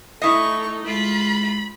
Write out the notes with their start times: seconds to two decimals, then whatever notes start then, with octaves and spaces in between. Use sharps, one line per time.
0.22 A3 D#4 E4 D#5 C#6
0.86 G#3 F4 B5